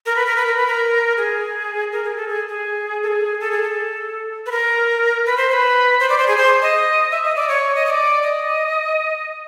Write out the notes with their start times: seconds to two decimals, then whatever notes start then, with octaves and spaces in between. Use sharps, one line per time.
0.06 A#4
0.16 B4
0.26 A#4
0.36 B4
0.46 A#4
0.57 B4
0.67 A#4
1.17 G#4
1.92 A#4
2.04 G#4
2.16 A4
2.28 G#4
2.49 G#4
3.03 A4
3.08 G#4
3.40 A4
3.51 G#4
3.62 A4
4.46 B4
4.52 A#4
5.26 B4
5.37 C5
5.49 C5
5.53 B4
6.00 C5
6.10 D5
6.18 C5
6.28 G#4
6.38 C5
6.62 D#5
7.11 E5
7.24 D#5
7.36 D5
7.49 C#5
7.75 D#5
7.86 D#5
7.90 D5
8.23 D#5